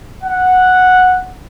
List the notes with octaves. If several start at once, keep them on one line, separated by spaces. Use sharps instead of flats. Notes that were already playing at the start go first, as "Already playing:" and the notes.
F#5